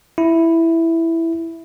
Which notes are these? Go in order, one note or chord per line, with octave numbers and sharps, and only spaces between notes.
E4